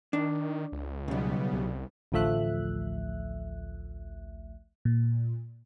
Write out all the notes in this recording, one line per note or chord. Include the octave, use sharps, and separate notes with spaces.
D#3 D4
C#2
B1 G#2 C#3 G3 B3
C2
A1 D2 F3 A3 E5 F#6
A#2